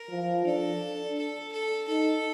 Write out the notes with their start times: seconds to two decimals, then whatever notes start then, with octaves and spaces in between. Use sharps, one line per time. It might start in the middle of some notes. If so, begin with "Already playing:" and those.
Already playing: A#4
0.11 F3
0.46 D4 A4
1.17 A4
1.52 A4
1.88 D#4 A4